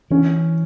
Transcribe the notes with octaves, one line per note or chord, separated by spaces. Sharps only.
E3 C#4